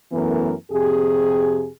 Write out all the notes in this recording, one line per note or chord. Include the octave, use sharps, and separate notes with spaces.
F#2 E3 A3 B3 A#4
F2 C3 G4 G#4